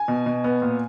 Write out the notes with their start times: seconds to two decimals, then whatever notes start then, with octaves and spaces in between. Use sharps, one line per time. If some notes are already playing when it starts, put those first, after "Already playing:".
Already playing: G#5
0.08 B2
0.26 B2
0.44 B3
0.62 A#2